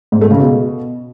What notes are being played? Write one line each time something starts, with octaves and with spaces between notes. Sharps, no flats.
G#2
A3
C#3
B2